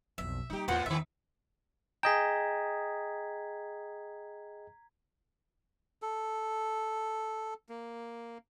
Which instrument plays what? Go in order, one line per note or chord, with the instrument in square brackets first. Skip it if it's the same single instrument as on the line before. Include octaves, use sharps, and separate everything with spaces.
[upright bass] B1 F2 [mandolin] E5
[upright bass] G3 A#3 [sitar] D#4 G4
[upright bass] E2 [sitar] A2 F4 [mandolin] F#4 C5 F#5
[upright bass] E2 [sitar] G#2 D#3 [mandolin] E5
[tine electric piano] G#4 D#5 G5 [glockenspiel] A#5 G#6 B6
[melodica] A4
A#3